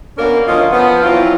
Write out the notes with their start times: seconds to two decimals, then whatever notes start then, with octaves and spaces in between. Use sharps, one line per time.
0.18 B2 A#3 C#4 D4 A#4
0.47 D2 F3 C#4 F4 D#5
0.72 F3 B3
1.03 E3 F#3 C4 F4